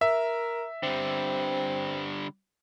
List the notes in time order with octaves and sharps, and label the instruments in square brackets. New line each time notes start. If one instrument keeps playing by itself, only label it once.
[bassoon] A#4 [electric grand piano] E5
[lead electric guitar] D3 G3 [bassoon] C4